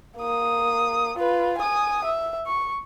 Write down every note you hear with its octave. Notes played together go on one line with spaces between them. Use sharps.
A#3 D#6
F4 B4
G#5 D#6
E5
C#6